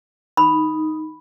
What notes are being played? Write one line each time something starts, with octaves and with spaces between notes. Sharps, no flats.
D#4 B5